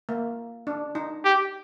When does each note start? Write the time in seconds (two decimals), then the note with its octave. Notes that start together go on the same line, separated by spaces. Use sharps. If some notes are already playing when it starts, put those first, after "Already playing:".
0.09 A#3
0.67 D4
0.95 D#4
1.25 G4